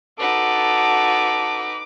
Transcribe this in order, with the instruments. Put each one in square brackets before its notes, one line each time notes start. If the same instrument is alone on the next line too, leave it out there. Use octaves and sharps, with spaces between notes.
[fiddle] D#4 B4 [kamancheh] F#4 A4 [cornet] A5 [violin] D6